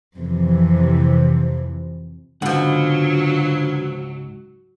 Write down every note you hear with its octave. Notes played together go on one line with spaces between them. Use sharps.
F2 C3 E3
C#2 G#2 B2 D3 F3 F#3 F#5